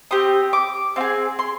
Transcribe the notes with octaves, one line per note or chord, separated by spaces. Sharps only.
C4 G4 D#6
D6
C4 F4 G#4
C6